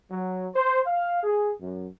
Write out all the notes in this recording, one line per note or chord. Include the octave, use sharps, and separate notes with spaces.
F#3
C5
F5
G#4
F#2